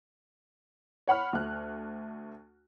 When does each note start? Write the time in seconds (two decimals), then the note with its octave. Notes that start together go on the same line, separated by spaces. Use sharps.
1.08 C#5 F#5 B5 F6
1.33 D2 A3 F#6